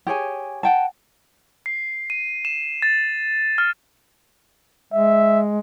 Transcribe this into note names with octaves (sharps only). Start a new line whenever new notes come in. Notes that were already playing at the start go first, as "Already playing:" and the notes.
G4 G#4 C#5 G#5
F#5 G5 A5
C7
D#7
E7
A6
F6
G#3 E5